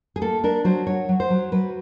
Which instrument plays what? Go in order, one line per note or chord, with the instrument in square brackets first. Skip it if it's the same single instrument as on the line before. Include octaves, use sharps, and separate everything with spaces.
[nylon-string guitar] G#4
A#3 A4
D4 A#4
F#3 C5
F#3 C#5
F#3
C5
F#3
F#3 B4